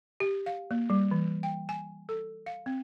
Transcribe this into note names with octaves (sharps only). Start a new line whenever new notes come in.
G4
F5
A#3
G3
E3
G5
G#5
A4
F5
C4